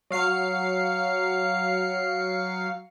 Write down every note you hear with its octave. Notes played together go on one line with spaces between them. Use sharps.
F#3 F5 C7 C#7